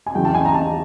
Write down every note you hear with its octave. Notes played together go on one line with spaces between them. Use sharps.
G#5
E2 C#3 F#3 G5
A5
G#5
A#5
A5